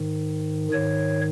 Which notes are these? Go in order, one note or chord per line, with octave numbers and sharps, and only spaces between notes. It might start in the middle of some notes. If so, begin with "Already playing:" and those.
Already playing: G#2 D#3
G#2 D#3 C#5